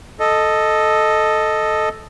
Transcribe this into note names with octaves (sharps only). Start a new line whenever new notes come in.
A4 D#5